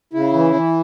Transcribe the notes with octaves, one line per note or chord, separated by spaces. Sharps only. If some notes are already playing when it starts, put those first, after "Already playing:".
C#3 E4
E3
E3